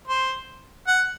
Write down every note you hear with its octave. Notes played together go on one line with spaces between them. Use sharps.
C5
F#5